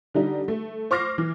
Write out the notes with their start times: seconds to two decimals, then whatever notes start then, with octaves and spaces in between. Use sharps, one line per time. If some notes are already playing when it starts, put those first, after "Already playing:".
0.14 D3 G3 D#4
0.48 A3
0.91 C5 C#6 D6 F6 A#6 C7
1.18 E3